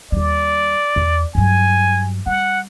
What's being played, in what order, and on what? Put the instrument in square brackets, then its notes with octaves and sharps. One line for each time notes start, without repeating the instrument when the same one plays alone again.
[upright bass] D#2 G3 [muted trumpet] D5
[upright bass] E2
[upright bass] G2 F#3 [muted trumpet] G#5
[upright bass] G3 [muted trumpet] F#5